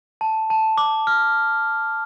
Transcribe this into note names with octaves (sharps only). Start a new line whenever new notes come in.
A5
A5
D6
F6